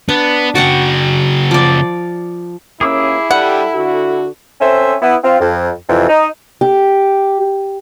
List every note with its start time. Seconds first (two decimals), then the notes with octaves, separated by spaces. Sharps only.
0.09 B3 D4
0.55 C#3 F#4 D5 F#5 G5
1.51 F3 D5
2.81 D#2 A#3 C#4 E4 G#4 D6 E6
3.31 G3 D4 A4 F#5
3.74 D3 F#4
4.61 C4 C#4 A4 C5 E5
5.02 B3 E4
5.24 C4 F4
5.41 F2
5.89 F2 C3 E3
6.09 D#4
6.61 G4